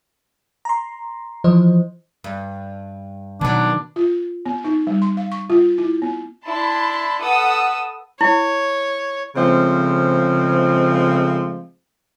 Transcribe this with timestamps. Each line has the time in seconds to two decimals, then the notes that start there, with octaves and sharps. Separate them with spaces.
0.65 A#5 C6
1.44 E3 F3 C5 D#5
2.24 G2
3.41 B2 D#3 F#3 D4
3.96 F4
4.46 B3
4.65 D#4
4.87 G3
5.02 C6
5.17 F5
5.32 C#6
5.50 F4
5.78 E4
6.02 B3
6.47 D4 E4 A5 B5 C6
7.21 A4 B4 F#5 D#6 E6
8.21 E4 C#5
9.36 C#3 F3 G#3 A3 C4